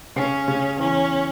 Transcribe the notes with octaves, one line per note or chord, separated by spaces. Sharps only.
C#3 C#4
C#3
E2 C#4